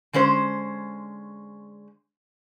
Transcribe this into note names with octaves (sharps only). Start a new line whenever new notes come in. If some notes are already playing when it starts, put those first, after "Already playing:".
D3 G#3 C#4 C5